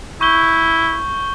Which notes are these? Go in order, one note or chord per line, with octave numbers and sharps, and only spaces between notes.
E4 C#6 G6 G7